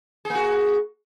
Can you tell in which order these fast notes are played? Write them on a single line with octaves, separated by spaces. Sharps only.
G#4 A#3 F#4